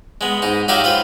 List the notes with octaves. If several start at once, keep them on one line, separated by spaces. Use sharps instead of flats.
G#3 B3
G#2 D#4
F#3 D#4 F#4 G4 E5 F5
F4 B4 C5